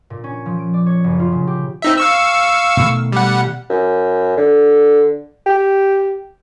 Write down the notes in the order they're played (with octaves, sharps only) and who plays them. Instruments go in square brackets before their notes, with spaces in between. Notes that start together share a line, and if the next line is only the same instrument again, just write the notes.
[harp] A#2
C#4
F3
D7
D5
C#5
F#1
F4
C#3
G4
[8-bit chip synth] C4 D#4 E5
F5 C#6 E6
[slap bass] B2 D#3 A3
[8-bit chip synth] G3 F#5
[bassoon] F#2
D3
G4